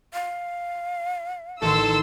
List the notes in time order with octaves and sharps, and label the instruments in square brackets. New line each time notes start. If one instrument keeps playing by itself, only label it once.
[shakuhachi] F5
[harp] A1 D#3 [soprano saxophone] A4 [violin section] C6 E6